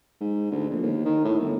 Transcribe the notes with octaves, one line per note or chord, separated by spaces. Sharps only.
G#2
D2
A#1
D#2
D#3
A2
G1